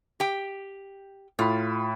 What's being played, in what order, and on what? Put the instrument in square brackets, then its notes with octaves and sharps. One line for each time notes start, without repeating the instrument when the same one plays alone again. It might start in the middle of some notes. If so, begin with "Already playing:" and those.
[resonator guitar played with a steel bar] G4 G5
[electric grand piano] A2 B5 [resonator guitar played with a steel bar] F4